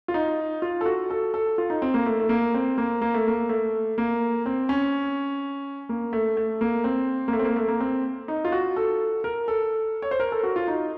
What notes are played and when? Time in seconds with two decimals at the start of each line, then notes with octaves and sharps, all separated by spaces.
0.08 F4
0.14 D#4
0.62 F4
0.81 A4
0.86 F#4
1.10 A4
1.34 A4
1.58 F4
1.70 D#4
1.82 C4
1.94 A#3
2.06 A3
2.20 A3
2.29 A#3
2.54 C4
2.78 A#3
3.02 A#3
3.14 A3
3.27 A#3
3.49 A3
3.98 A#3
4.46 C4
4.69 C#4
5.89 A#3
6.13 A3
6.37 A3
6.61 A#3
6.84 C4
7.28 A#3
7.33 A3
7.39 C4
7.45 A#3
7.56 A3
7.68 A#3
7.80 C4
8.28 D#4
8.45 F4
8.52 F#4
8.76 A4
9.24 A#4
9.48 A4
10.02 C#5
10.11 C5
10.20 A#4
10.32 A4
10.43 F#4
10.56 F4
10.68 D#4